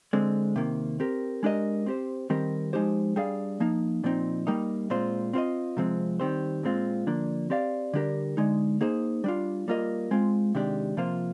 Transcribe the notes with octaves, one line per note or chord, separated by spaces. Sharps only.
D3 G#3 C4
C3 D#3 A#3
C4 G4 A#4
G#3 D4 G4 A#4 D#5
C4 G4 C5
D#3 G3 C4 G4 A#4
F3 G#3 D#4 G4 C5
G3 D4 G#4 D5 F5
F3 A#3 D#4
A#2 F3 C4 D#4
G3 A#3 D#4
A#2 G#3 C4 F4 C5
C4 F4 C5 D#5
C3 F3 G#3 C4
D#3 G3 C4 G4 C5
A#2 G#3 C4 F4
D3 F3 A#3 D4
C4 G4 D5 F5
D3 G3 D4 G4 A#4
D3 G#3 D#4
A#3 D#4 G#4 C5
G3 D4 F4
G3 A#3 F4 A#4 D#5
G#3 C4 F4
C3 D#3 G#3 D4 G4
C3 F3 A#3 F4 C5